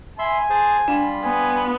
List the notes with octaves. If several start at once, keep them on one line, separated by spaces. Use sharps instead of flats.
E5 G#5 B5 C6
G#4 C5 A5
G3 D4 F4 B5
B3 G#5